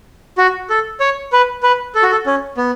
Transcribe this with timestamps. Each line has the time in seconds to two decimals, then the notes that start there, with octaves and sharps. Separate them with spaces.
0.38 F#4
0.70 A4
1.00 C#5
1.33 B4
1.63 B4
1.95 A4
2.03 F#4
2.11 A4
2.26 C#4
2.57 B3